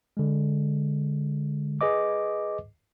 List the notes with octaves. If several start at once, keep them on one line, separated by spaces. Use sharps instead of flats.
D3 G#3
G#4 B4 D#5 D6